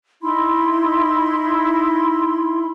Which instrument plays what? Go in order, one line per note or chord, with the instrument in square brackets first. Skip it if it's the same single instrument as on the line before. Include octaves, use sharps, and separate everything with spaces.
[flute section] D#4 E4 B5 C6